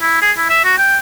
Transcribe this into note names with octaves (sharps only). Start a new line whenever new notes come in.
E4
G#4
E4
E5
F#4
G5